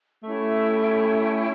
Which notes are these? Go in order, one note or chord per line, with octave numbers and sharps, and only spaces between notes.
A3 C#4 E4 G4